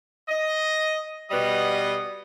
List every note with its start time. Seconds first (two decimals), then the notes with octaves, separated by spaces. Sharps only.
0.29 D#5
1.31 B2 G3 B3 D#5